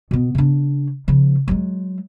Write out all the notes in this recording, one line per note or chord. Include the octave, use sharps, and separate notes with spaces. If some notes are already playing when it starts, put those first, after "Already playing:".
B2 B3
C#3 D4
C#3 F3
F#3 G#3